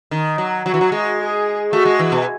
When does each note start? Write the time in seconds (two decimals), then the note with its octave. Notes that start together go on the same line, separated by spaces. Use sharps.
0.11 D#3
0.38 F#3
0.65 F#3 F#4
0.74 E3
0.81 F#3
0.92 G#3
1.19 G#4
1.72 A3 F#4
1.85 G#3
1.99 E3
2.12 B2